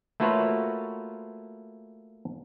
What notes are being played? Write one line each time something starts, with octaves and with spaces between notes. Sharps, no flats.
A3 A#3 F4 F#4 B4 C#5